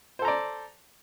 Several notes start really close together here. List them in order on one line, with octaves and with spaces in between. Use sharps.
C5 A4 A#5 D5